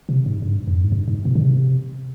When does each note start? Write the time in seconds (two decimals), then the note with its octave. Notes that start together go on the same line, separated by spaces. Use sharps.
0.09 C3
0.26 G#2
0.42 G2
0.67 F2
0.83 G#2
0.92 G2
1.08 G#2
1.25 B2
1.35 D3
1.42 C3